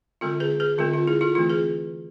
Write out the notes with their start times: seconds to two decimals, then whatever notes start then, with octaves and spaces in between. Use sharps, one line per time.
0.21 D3 G#3 C4 F4 A4
0.40 G#4 B4
0.60 G#4 B4
0.78 D3 G#3 C4 F4
0.94 F4
1.07 E4 G#4
1.21 F4 A4
1.35 E3 A3 C4 F4
1.50 G#4 B4